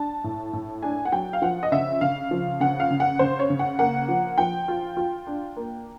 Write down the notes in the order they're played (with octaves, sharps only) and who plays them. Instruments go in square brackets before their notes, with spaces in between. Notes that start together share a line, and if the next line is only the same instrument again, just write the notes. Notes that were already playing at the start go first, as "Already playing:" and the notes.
Already playing: [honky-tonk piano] D4 A5
A2
A2
D4 G#5
F#5
F#3 G5
F5
F3 F#5
D#5
C#3 E5
C#3 F5
F3
C#3 F#5
F5
C#3
F#5
C#3 C5
C#5
C#3
F#5
A#3 F#5
F3
F3 G5
F4
F4
D4
A#3